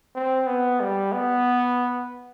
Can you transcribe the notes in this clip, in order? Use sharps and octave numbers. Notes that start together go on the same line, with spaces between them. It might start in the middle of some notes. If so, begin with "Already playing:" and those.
C4
B3
G3
B3